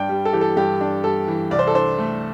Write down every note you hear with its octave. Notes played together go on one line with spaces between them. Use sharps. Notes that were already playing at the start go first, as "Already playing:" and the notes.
Already playing: G2 D4 G5
G3
A4
E3 G4
A4
G2 G4
D4
G3 A4
E3
C2 D5
C5
A4
D4 C5
A3